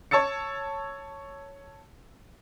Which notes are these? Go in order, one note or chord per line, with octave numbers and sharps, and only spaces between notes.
C#5 A5 E6 A6 C#7